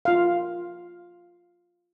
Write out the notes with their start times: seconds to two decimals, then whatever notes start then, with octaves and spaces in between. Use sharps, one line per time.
0.05 F4 F5